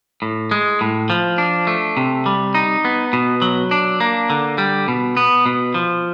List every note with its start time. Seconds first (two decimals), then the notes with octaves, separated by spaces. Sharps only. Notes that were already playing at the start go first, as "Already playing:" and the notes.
0.22 A2
0.51 G#3
0.81 A2
1.10 F3
1.38 D4
1.67 A3
1.97 C3
2.26 G3
2.55 D#4
2.85 B3
3.13 B2
3.42 F#3
3.71 D4
4.00 A#3
4.30 D3
4.58 G3
4.88 B2
5.17 B3
5.46 B2
5.74 F3